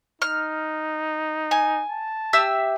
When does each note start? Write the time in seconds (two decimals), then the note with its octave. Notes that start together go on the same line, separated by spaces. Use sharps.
0.22 D#4 F6
1.51 G#5
1.89 A5
2.33 G4 E5 E6